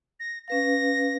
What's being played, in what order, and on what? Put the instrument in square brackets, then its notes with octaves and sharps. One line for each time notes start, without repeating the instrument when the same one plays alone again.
[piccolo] A#6
[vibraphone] C#4 B4 F5 [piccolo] A#6